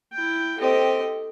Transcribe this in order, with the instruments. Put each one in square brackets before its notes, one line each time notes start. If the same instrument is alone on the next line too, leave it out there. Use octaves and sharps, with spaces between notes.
[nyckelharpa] E4 G5
[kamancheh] C4 G4 [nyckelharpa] A4 D#5